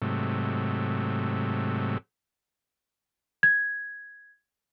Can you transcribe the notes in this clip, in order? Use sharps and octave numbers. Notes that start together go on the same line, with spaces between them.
G#2 C3 F#3 A3
G#6